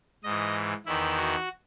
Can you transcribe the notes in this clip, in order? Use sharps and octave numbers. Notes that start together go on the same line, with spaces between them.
G#2 E3 D#5
E2 D#3 E4
F#4